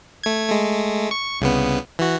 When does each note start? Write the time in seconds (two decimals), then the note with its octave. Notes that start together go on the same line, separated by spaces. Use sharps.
0.24 A3 G#6
0.49 G#3 A3
1.11 C#6
1.41 C2 C#3 B3
1.99 E3 F#4